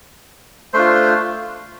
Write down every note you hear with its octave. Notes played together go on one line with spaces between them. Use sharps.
A3 D4 F4 C5